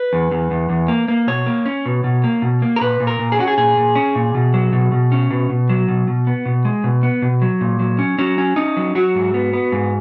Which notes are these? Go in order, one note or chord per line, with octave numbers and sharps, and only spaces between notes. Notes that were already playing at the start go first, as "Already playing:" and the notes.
Already playing: B4
E2
E2
E2
E2
A#3
A#3
B2 C#5
A#3
C#4
B2
B2
A#3
B2
A#3
A#4
A#2 B4
A#2
A#4
A#2
G#4
C#4 F#4
G#4
A#2 G#4
A#2
C#4
A#2
B2
F#3
B2
B2
C#4
B2
B2
F#3
B2
B2
B3
B2
G#3
B2
B3
B2
F#3
A#2
F#3
C#4
F#3 C#4
C#4
C#4 D#4
F#3
F#3 F#4
G#2
B3
B3
G#2